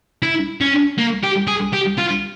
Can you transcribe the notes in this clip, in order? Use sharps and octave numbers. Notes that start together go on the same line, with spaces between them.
E4
C#4
A#3
G4
G#4
G4
F4